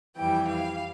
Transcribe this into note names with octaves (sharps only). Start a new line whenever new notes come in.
F2 E3 G3 G5
F5